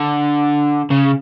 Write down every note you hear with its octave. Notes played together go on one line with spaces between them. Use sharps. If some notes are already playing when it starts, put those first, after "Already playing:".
Already playing: D3
C#3